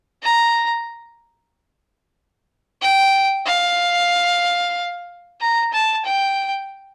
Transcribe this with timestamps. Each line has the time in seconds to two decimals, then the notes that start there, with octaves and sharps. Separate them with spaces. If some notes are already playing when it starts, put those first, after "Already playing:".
0.23 A#5
2.81 G5
3.46 F5
5.41 A#5
5.72 A5
6.05 G5